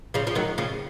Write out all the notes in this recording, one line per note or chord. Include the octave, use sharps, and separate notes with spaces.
C#3 F3
F3
D#3 F#3
C#3 F3